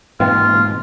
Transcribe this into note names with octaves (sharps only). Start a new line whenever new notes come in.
G#2 B2 E3 A#3 C4 F4